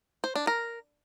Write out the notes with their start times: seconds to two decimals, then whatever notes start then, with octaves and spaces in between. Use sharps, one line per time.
0.24 C5
0.36 D4
0.47 A#4